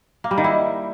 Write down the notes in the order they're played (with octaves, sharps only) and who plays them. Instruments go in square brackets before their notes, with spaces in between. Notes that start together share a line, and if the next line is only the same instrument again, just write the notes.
[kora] A#3
G3
D#3
E4